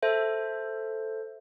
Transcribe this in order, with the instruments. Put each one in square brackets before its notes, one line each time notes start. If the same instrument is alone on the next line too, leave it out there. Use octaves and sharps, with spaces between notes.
[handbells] A4 C5 E5